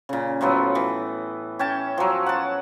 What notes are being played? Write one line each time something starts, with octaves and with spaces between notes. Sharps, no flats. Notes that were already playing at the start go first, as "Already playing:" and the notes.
A#2 C#3
A2 F3 F#3 B3
E3
C#4 G5 A5
F3 F#3
F#5 A5